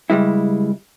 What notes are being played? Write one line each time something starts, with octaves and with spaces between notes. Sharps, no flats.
C#2 G3 G#3 E4